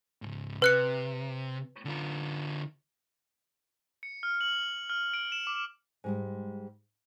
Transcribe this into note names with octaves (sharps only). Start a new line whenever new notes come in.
C#2 G#2
C3 B4 F#6 C#7
D3 F4
C#7
F6
F#7
F6
D7
E7
D6
G#2 G3 G#3